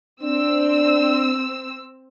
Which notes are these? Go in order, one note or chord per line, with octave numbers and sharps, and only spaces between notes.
C4 D4 E6